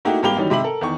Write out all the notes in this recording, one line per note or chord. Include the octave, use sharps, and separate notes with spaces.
A3 A#3 D#4 E4 F#4 G4
G#1 G2 A#3 G4 F7 G7
D#3 E3 F#3 G3 C#4 D#4
G#2 C3 E5 B5 F#7
A4 A#4
E2 D#3 C#6